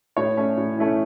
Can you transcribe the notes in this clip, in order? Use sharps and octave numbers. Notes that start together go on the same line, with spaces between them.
A2 C#5
E3 A3 C#4
A2
E3 A3 C#4